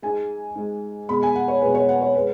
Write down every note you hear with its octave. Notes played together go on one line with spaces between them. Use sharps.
G#2 G#3 G#5
G#2 G#3
B2 G#3 B5
G#5
F#5
C#5
B2 G#3 B4
C#5
F#5
C#5
G#3 B4